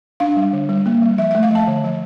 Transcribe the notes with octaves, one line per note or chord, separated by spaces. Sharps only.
D4 F5
G3
D3
G3
A#3
G3
F3 E5
A3 E5
F5
F3 A5
D3
F3